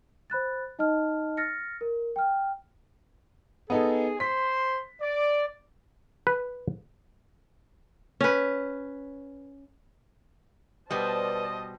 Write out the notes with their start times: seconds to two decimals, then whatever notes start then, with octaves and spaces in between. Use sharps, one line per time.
0.30 C5 B5 F#6 A6
0.79 D#4 D#5 A5 F6
1.37 F6 A6 A#6 C#7
1.81 A#4
2.16 G5 F6
3.70 B3 D#4 G#4 A4
4.20 C5 C6 B6
5.02 D5
6.27 B4
8.21 C#4 B4
10.90 B2 G3 B4 C5 D5 D#5 A5